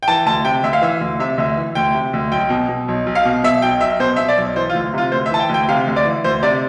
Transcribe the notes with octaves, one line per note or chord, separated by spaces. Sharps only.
G5
E3 A5
D2 A5
C3 G5
D2 E5
F5
E3 E5
D2
C3 E5
D2 E5
E3
D2 G5
C3
D2
B1 G5
B2
B2
B1
B1
F5
B2
B2 E5
B1 G5
B1 E5
B2 C5
B2 E5
D5
B1
E3 C5
F4
D2
C3 F4
D2 C5
E5
E3 A5
G5
D2
G5
C3 F5
D2
D5
E3
D2 C5
C3 D5